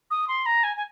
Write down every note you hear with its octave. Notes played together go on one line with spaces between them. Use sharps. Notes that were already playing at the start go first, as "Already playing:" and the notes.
D#6
C6
A#5
G#5
G#5